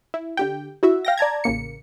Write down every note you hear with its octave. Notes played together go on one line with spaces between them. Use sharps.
E4
D3 G4 G5
E4 F#4 E5
F5 G5 A#6
D5 A5 A#5 G#6
A1 C#3 A#3 C#7